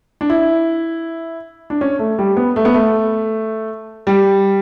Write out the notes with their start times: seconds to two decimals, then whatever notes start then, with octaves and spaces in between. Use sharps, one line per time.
0.21 D4
0.30 E4
1.70 D4
1.81 C#4
1.99 A3
2.18 G3
2.37 B3
2.56 A3
2.65 B3
2.74 A3
4.07 G3